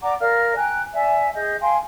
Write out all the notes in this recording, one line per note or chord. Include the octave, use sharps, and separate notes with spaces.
D5 F#5 A#5 D6
A#4 D5 F5 F6
G5 G#5 A#5 F#6
D5 E5 G#5
G#4 D#5 G6
F5 G5 G#5 C6